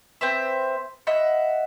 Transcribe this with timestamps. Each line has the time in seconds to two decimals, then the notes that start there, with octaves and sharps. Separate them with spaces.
0.21 C4 B4 C5 E5
1.07 D#5 E5 F#5 B5